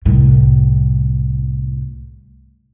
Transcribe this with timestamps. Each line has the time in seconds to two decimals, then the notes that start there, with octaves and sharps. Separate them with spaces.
0.05 C2 A2